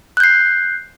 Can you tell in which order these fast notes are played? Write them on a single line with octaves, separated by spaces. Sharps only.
F#6 G6 C7